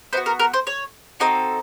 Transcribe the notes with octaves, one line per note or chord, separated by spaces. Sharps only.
B3 D#4 F#4 C5
A#4
A#4
C5
C#5
C4 D#4 F#4 A4 D#5